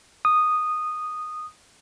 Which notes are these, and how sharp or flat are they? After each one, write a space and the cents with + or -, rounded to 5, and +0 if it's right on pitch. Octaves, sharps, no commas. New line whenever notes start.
D#6 -10